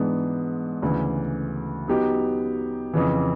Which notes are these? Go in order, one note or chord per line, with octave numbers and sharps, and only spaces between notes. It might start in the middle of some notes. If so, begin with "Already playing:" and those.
Already playing: G#2 E3 G#3 B3 D4
D2 C#3 E3
F#3 B3 D#4 G4
F2 C#3 E3